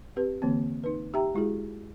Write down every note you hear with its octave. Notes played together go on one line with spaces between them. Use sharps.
C4 G4 B4
D3 E3 A#3 C4
D#4 B4
D#4 G4 E5 G5 A#5
G#3 E4 F#4 G#4